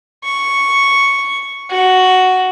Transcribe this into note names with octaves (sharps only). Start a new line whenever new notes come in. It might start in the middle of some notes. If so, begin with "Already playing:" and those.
C#6
F#4